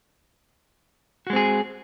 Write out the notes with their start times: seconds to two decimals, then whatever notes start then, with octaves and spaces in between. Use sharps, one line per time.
1.27 F#4
1.30 G#3
1.33 C4
1.36 G#4